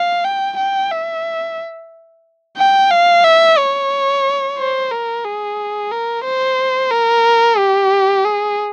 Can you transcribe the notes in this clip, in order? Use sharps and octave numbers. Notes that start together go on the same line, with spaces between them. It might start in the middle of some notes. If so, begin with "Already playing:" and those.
Already playing: F5
G5
G5
E5
G5
F5
E5
C#5
C5
A#4
G#4
A#4
C5
A#4
G4
G#4